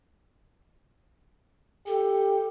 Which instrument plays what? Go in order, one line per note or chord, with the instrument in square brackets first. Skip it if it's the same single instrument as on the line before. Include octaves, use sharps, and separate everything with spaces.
[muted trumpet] G4 [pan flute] A4